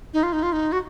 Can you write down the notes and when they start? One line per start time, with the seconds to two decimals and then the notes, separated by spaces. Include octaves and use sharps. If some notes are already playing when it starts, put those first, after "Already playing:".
0.14 D#4
0.23 F4
0.33 D#4
0.43 F4
0.53 D#4
0.72 F#4